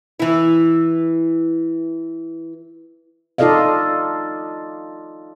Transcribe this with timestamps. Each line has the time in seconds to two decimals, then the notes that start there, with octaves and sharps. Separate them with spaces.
0.20 E3 E4
3.38 D#4 F4 A4 D5 D#5 F5